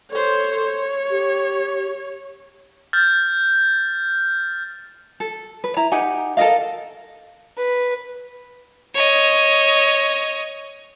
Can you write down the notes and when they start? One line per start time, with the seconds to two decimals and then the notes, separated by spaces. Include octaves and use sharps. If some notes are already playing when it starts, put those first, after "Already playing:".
0.11 A4 C5 C#5
0.65 C#5
1.10 G4
2.93 F6 G6 A6
5.20 A4
5.64 B4
5.77 E4 A#5
5.92 D#4 G4 F#5 G#5
6.37 A4 A#4 D#5 F5
7.57 B4
8.94 C#5 D#5